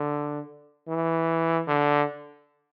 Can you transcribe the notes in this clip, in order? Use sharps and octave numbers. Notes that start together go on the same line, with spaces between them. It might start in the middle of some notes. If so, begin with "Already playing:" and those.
Already playing: D3
E3
D3